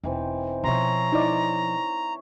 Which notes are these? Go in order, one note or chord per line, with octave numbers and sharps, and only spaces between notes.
E1 D#3 E3 C4
B2 F3 C#5 E5 A#5 C6
D#4 E4 D5